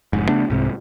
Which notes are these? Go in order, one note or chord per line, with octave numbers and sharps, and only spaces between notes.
F1 G#2
C#3 A3 B3 D4
C2 G#2 C3